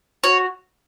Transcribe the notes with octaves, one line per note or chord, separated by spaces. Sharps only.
F#4 C#5